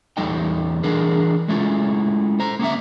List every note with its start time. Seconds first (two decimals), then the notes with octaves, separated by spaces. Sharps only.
0.17 E2 G3 D#4 A4 D#5 G5
0.84 E3 D4 G#4 A#4
1.48 G#3 A3 C#4 E4 F4
2.40 C5 A#5
2.59 A#3 B3 C#4 E5